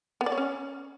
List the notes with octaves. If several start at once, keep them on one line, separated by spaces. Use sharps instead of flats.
B3
D5
C#5
C#4